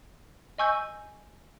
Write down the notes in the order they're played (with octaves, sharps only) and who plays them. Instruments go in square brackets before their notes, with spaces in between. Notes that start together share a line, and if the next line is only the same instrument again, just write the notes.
[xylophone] D#5 G#5 C#6 E6 G6